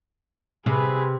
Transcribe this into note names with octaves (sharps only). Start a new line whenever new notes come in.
C3 G#4 B4